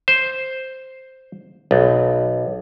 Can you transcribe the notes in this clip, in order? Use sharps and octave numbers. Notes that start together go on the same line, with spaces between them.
C5
B1